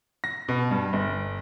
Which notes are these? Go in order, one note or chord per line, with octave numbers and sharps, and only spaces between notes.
A#6
B2
G2
G1